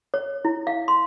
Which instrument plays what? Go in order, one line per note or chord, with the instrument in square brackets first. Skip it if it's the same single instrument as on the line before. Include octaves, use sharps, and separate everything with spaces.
[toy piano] C#5
E4
F5
C6